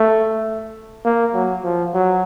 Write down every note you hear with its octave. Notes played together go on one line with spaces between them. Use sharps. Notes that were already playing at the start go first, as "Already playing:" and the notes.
Already playing: A3
A#3
F#3
F3
F#3